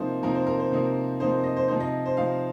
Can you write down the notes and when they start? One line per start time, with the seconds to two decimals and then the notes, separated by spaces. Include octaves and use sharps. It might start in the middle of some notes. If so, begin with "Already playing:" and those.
Already playing: C3 F3 A#3 D#4 C5
0.23 C3 F3 A#3 D#4 A#4
0.35 C5
0.47 A#4
0.59 C5
0.71 C3 F3 A#3 D#4
1.20 C3 F3 A#3 D#4 C5
1.43 D#5
1.56 C5
1.68 C3 F3 D#4 C5
1.80 D#5
2.06 C5
2.17 C3 F3 D#4 F5